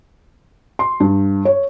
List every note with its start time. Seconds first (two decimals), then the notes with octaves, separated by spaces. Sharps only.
0.79 C6
1.00 G2
1.45 C#5